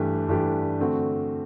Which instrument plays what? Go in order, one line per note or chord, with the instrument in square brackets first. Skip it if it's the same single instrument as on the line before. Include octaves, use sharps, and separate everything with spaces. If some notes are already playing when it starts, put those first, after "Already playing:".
Already playing: [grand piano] G2 E3 A3 D4 G4
G2 E3 A3 D4 G4
D3 A3 C4 F#4